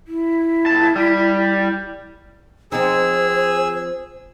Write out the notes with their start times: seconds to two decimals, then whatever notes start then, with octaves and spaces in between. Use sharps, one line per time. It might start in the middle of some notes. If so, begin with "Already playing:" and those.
0.07 E4
0.66 A#2 A5
0.96 G3
2.72 F3 C4 D#4 G#4 C5 E6